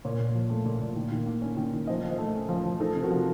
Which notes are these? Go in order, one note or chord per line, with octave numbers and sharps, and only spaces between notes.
A#2 A#4 C#5
A#2
F3
A3
A#2
A#2
D#3
D#3
A#3
C#4
D#3
D#3
F3 C5 D#5
F3
C5 D#5
A3
C#4
F3
F3
D#4 A4 C5
C3
F#4 A#4
F3